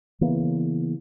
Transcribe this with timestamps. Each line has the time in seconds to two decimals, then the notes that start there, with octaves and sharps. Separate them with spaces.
0.21 C#3 E3 A#3 B3